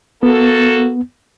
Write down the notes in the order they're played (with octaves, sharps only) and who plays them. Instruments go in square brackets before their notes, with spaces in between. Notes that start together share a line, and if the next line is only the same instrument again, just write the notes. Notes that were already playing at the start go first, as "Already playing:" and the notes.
[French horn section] A#3 F#4 A4 [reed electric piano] B3